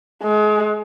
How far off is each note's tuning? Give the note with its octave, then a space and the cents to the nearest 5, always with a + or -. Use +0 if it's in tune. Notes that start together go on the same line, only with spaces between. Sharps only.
G#3 +30